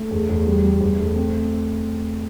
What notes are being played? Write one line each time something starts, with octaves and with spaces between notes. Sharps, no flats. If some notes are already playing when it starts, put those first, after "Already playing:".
Already playing: A3
E2
E2
G3
G3
E2
A3
C4